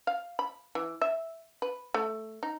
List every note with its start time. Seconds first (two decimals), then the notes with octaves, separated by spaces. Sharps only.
0.07 F5
0.39 B5
0.75 E3
1.01 E5
1.62 B4
1.94 A3
2.43 D#4